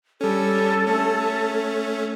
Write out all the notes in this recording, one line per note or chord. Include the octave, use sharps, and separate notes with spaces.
G3 C#4 A4
A3 C#4